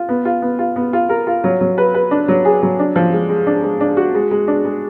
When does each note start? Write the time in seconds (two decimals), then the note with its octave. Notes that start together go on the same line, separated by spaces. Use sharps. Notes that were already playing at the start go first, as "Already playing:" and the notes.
Already playing: F4
0.09 B3
0.25 F4
0.42 B3
0.59 F4
0.76 B3
0.93 F4
1.09 A#4
1.27 F4
1.44 F#3
1.61 F#3
1.78 B4
1.94 B4
2.11 D4
2.28 F#3
2.45 G#4
2.62 F#3
2.79 D4
2.96 F3
3.13 G#3
3.29 G#3
3.47 D4
3.63 G#3
3.81 D4
3.97 F#4
4.14 G#3
4.31 G#3
4.48 D4
4.65 G#3